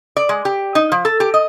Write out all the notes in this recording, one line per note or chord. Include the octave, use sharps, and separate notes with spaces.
D5
G#3
G4
D#4
F3
A4
G4
D#5